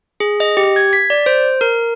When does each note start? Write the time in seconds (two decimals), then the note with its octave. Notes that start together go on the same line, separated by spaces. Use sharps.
0.20 G#4
0.40 D#5
0.57 G4
0.76 G#6
0.93 B6
1.10 D5
1.26 C5
1.61 A#4